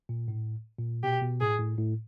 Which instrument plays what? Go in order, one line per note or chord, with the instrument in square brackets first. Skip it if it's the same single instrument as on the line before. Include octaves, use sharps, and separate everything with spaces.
[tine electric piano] A#2
A2
A#2
[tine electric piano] B2 [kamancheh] G4
[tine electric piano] B2
[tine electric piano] A2 [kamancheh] G#4
[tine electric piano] A2
A2